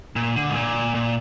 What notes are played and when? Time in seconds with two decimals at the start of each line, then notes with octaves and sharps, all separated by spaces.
0.16 A#2
0.36 D3
0.49 G#2
0.56 A#2
0.95 A#2